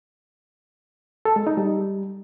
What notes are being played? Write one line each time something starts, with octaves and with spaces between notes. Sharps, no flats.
A4
G#3
D#4
G3